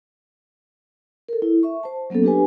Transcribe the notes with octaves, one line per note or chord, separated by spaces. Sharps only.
A4 A#4
E4
E5 C#6
C5 A5
F#3 A#3 B3 C#4 A4
D4 G4 B4 G#5